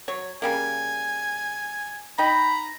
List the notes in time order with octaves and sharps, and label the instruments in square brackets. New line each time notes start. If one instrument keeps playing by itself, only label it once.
[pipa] F#3 C#5
[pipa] C#3 G3 A#3 [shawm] G#5
[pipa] D#4 G5 [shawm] A#5 [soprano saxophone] B5